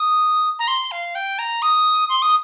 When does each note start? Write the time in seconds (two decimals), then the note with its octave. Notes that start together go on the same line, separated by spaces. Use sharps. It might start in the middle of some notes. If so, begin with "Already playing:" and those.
Already playing: D#6
0.59 A#5
0.68 C6
0.91 F5
1.15 G5
1.39 A#5
1.62 D#6
2.09 C6
2.22 D#6